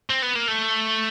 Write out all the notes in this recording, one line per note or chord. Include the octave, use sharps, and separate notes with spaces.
C4
B3
A#3
A3